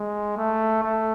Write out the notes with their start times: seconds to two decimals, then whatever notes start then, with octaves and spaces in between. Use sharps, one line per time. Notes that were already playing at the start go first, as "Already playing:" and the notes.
Already playing: G#3
0.37 A3
0.83 A3